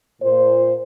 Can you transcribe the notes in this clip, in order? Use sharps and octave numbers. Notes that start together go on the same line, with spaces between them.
A#2 C5